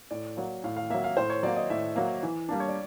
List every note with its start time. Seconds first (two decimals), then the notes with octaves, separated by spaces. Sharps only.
0.11 A2 D5
0.37 F#3 A#3
0.64 A2 F5
0.76 F5
0.90 F#3 A#3 E5
1.04 F5
1.17 A2 C5
1.30 C#5
1.43 F#3 A#3 D5
1.56 D#5
1.70 A2 E5
1.96 F#3 A#3
2.23 E3
2.49 G3 A#3 D4
2.60 C#5
2.68 D5